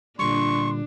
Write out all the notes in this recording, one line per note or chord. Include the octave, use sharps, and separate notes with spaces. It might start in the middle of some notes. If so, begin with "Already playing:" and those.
A#2 D3 G3 D4 C6 C#6